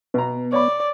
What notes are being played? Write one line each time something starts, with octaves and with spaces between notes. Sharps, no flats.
B2 B3 A#5
C#5 D5 B5